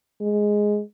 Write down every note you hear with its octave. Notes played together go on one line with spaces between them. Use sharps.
G#3